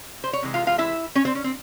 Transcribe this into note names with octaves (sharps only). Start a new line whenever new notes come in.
C5
C#5
C3 E3 G#3
F4 F5
F4 F5
E4 E5
C#4 C#5
C4 C5
C#4
C4